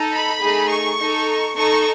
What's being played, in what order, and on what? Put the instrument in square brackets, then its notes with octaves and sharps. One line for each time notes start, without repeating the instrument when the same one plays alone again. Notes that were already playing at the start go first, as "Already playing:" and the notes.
Already playing: [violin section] D#4 A4
B5
A3 D#4 G#4
C#6
D#4 A4
D#4 A4 C#6